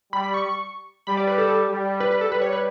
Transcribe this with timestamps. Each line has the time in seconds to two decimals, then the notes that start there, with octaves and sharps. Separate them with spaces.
0.13 G3 B5
0.24 B5
0.34 C#6
1.07 G3 B5
1.17 D5
1.27 B4
1.38 A4
1.69 G3
2.00 B4
2.11 B4
2.21 A4
2.32 G3 B4
2.42 C#5
2.53 B4